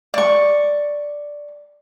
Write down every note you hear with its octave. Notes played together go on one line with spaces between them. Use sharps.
D5 C#6